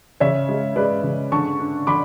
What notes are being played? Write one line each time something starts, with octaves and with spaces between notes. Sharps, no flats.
C#3 C#5 E5
G#3
G#3 B4 D5
C#3
D3 A5 C#6
D4
D3 B5 D6